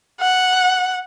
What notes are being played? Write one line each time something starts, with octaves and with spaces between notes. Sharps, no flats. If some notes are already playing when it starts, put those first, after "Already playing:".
F#5